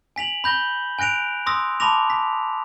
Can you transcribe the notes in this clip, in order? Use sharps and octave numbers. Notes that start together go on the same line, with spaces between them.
G#5 B6 F7 F#7
B5 G6 A#6 G7
G#5 F#6 A#6 D7 F7
C6 D#6 E6 A#6
A5 B5 C6 D6 A#6 F7
B6